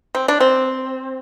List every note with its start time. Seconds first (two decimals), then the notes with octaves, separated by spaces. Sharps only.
0.15 C4
0.28 D4
0.40 C4